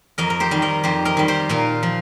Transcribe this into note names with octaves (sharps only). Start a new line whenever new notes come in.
F2 A#4 D#5
A#4
G4 C5
D#3 G3
A#4 D#5
F2 G4 C5
A#4 D#5
D#3 G3
G4 C5
A#2 F4 A#4
F3